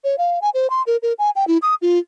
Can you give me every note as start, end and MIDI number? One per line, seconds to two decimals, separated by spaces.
0.04 0.16 73
0.18 0.39 77
0.42 0.50 80
0.54 0.70 72
0.70 0.82 84
0.87 0.97 70
1.02 1.13 70
1.19 1.30 80
1.36 1.47 79
1.48 1.58 64
1.62 1.75 87
1.82 1.99 65